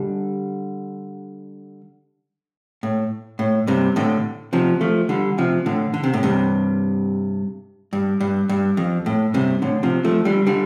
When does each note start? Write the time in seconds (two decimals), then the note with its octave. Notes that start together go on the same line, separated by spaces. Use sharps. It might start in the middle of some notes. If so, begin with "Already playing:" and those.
Already playing: D3 G3
2.83 A2
3.39 A2
3.67 G2 C3
3.96 A2 D3
4.53 C3 F3
4.81 F3 A3
5.09 D3 G3
5.38 C3 F3
5.66 A2 D3
5.94 D3
6.04 C3
6.14 A2
6.23 G2 C3
7.93 G2
8.20 G2
8.49 G2
8.77 F2
9.06 A2
9.34 G2 C3
9.62 A2 D3
9.83 C3 F3
10.04 F3 A3
10.25 D3 G3
10.47 D3 G3